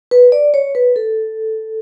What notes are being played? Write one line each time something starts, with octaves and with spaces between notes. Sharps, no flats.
B4
D5
C#5
B4
A4